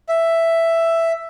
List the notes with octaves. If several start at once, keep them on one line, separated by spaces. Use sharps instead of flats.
E5